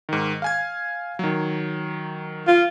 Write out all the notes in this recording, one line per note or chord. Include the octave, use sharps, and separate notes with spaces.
G#2 D#3
F5 G#5 G#6
D#3 F#3
F4